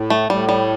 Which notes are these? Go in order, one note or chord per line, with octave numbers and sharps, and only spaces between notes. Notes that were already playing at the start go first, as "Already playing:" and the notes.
Already playing: A2
A3
A2 G3
G3